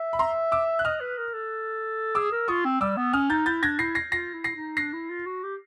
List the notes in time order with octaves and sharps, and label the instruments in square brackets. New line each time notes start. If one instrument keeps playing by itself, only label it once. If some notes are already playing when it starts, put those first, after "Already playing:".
Already playing: [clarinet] E5
[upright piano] B5
A#5 C6
D6 E6
F#6
[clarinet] D#5 [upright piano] D#6 F6
[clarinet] B4
A#4
A4
[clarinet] G#4 [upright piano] D6 E6
[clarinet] A#4
[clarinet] F4 [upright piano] C#6 D#6
[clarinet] C4
[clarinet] G3 [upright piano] D6 E6
[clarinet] B3
[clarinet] C#4 [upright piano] D#6 F6
[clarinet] D#4 [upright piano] G6 A6
[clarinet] E4 [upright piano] G6 A6
[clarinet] D4 [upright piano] G#6 A#6
[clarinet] E4 [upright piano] A#6 C7
[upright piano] A#6 C7
[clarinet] F4 [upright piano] A#6 C7
[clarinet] E4
[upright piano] A#6 C7
[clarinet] D#4
[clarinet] D4 [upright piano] A#6 C7
[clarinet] E4
F4
F#4
G4